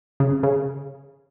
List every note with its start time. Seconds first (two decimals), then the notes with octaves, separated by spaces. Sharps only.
0.20 C#3
0.43 C#3